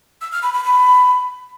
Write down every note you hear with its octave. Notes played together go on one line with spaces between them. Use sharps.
E6
F6
B5
B5
B5